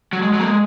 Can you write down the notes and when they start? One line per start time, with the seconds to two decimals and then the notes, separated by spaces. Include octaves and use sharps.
0.13 F#3
0.23 G#3
0.33 F#3
0.40 A#3
0.44 G#3